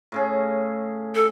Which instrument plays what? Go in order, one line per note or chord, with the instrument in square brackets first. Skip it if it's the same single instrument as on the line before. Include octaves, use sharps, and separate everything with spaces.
[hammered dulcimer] A2 C#3 G#4
[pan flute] A4